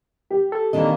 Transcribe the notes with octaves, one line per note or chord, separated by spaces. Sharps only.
G4
A4
C3 D#3 E3 A#3 D4 D#5